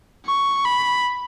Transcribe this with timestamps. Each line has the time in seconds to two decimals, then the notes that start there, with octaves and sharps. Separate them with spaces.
0.26 C#6
0.65 B5